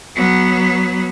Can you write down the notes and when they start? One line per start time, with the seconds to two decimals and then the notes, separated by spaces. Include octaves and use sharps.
0.15 F#3 B3